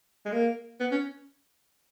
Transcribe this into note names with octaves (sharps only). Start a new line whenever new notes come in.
G#3
A#3
B3
C#4